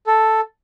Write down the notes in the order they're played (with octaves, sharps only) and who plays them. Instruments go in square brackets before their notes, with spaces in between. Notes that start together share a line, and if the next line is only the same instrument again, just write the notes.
[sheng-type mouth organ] A4